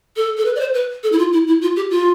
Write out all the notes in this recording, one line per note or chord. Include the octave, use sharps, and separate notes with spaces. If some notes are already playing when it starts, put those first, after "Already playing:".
A4
A4
B4
D5
C5
B4
A4
E4
F4
E4
E4
F4
G4
F4